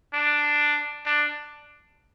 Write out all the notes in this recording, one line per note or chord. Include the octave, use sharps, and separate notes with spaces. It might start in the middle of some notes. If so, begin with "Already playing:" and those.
D4
D4